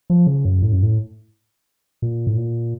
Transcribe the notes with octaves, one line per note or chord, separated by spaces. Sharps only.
F3
C#3
F#2
A2
F#2
A2
A#2
A2
A#2